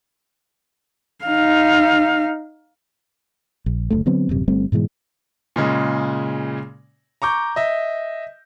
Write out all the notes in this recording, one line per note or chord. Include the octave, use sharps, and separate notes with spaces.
D#4 F5
A#1
F#1 D2 A3
D3 F#3 B3 C4
D#1 F#2 C3
G1 G3 A3 C4
G#2 B2 E3 G#3
A#2 C#3 G#3
A#5 C#6 D6 G6
D#5 E5